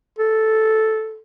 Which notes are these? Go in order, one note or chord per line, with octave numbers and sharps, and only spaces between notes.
A4